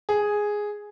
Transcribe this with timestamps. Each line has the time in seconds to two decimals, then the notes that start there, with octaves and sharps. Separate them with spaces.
0.09 G#4